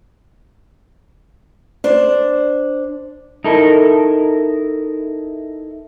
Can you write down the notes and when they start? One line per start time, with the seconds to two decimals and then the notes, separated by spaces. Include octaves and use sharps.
1.84 D4 C5
3.44 D#4 E4 A4 A#4